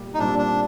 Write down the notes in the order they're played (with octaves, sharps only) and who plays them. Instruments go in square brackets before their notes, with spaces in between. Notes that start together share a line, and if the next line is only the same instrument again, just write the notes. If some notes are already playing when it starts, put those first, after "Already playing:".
Already playing: [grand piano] A#2 G3
[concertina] D#4
[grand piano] A#2 G3 C4 [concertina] D4
[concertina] D4